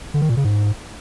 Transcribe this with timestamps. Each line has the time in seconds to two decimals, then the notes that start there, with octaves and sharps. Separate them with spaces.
0.14 D3
0.22 D#3
0.29 A#2
0.37 C#3
0.44 G#2